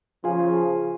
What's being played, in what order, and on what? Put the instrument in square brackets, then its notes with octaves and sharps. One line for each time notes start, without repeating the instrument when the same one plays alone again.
[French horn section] C#3 F3 [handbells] F4 G#4 F5 G#5